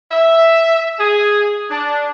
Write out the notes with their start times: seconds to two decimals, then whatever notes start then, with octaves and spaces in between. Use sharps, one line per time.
0.11 E5
0.99 G#4
1.71 D4